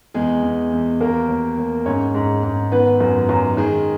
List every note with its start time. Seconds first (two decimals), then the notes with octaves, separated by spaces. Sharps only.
0.14 E2 G#3 G#4
0.43 E2
0.72 E2
1.00 D#2 A#3 A#4
1.29 D#2
1.58 D#2
1.86 G#2 C#4 C#5
2.15 G#2
2.43 G#2
2.72 D#3 B3 B4
3.00 F#2
3.29 F#2
3.57 D#3 G#3 G#4